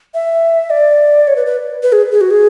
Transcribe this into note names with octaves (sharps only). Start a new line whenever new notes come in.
E5
D5
C#5
B4
B4
B4
G#4
G#4
F#4
G#4